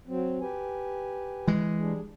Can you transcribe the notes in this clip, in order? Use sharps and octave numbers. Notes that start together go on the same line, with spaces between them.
F#3 C4
G4 B4 G#5
E3 G#3
G3 D4 G#4